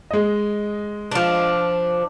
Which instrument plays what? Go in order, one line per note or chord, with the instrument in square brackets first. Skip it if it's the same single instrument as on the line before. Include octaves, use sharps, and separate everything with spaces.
[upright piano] G#3 D#5
[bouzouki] F3 D4